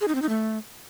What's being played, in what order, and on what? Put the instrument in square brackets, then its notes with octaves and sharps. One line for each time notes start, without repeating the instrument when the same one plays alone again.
[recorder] G#4
D#4
C4
D#4
A3